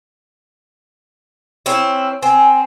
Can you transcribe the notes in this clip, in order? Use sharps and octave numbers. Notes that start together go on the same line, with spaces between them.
C4 C#4 E4
C4 G#5